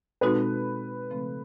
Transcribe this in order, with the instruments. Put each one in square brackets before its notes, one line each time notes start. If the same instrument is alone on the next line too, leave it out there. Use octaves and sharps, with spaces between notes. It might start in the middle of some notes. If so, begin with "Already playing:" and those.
[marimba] B2 G#3 C4 D#4 F#4 [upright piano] A4 B4
[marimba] C#3 F3 A3 C4